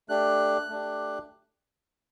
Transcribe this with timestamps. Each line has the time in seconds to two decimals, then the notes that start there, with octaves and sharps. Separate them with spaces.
0.09 A3 D4 G4 F#6
0.70 A3 D4 G4